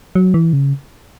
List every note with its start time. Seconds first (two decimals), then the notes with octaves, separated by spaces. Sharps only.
0.15 F#3
0.34 E3
0.53 C#3